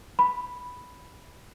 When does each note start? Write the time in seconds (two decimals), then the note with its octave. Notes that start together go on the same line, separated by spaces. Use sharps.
0.19 B5